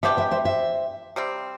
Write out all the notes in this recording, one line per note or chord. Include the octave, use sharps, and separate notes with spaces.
E3 B3 D4 G4 C5 E5
C5 E5
C5 E5
C5 E5
C3 G3 C4